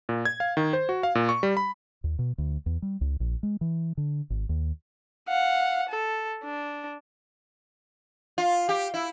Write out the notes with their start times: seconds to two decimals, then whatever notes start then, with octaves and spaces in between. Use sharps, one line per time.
0.09 A#2
0.25 G#6
0.40 F5
0.57 D#3
0.73 C5
0.89 F#4
1.03 F5
1.15 A#2
1.29 C#6
1.43 G3
1.57 B5
2.04 D#2
2.19 B2
2.38 D2
2.66 E2
2.82 G3
3.01 C#2
3.20 A#1
3.43 G#3
3.61 E3
3.97 D3
4.30 G#1
4.49 D#2
5.28 F5 F#5
5.89 A4
6.44 D4
8.38 F4
8.69 G4
8.94 E4